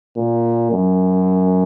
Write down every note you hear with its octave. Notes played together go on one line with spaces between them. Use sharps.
A#2
F#2